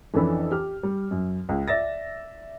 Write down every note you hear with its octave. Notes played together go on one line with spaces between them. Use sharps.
F2 E3 C#4 D4 A4 B5
G4 F6
G3
F#2
C#2
D5 E5 A6 A#6